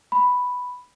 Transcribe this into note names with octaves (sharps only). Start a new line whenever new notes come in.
B5